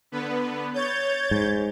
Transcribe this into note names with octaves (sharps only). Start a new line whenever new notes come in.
D3 B3 B4
C#5 G6 A6
G#2